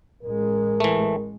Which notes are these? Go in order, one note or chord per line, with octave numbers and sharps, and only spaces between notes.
A1 G#3 A#4
E3 A3